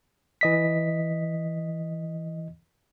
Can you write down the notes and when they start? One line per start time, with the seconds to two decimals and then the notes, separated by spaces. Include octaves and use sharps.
0.41 E3 D#5 B6